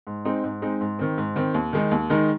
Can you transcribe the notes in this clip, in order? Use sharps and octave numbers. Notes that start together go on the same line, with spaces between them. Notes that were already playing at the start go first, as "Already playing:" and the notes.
G#2
G#3 C4 D#4
G#2
G#3 C4 D#4
G#2
D#3 C4
G#2
D#3 C4
D#2
D#3 G#3 D#4
D#2
D#3 G#3 D#4